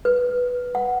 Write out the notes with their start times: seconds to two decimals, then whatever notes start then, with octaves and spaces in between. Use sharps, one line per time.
0.05 B4
0.75 F#5